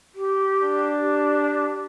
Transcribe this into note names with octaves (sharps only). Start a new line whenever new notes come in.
G4
D4
G4